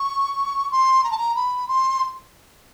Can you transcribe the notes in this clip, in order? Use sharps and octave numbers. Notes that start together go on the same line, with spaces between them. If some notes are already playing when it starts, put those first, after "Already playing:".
Already playing: C#6
C6
A#5
A5
A#5
B5
C6